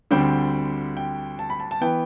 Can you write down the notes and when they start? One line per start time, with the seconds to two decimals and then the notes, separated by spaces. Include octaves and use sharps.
0.11 D2 D3 G3 C4 G5
0.97 G5
1.39 A5
1.50 B5
1.60 A5
1.71 A5
1.81 E3 B3 G5